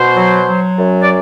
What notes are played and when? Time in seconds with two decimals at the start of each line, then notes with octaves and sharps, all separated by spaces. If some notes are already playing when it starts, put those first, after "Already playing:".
Already playing: B2 C5
0.15 F#3
0.46 F#3
0.77 F#2
1.01 D5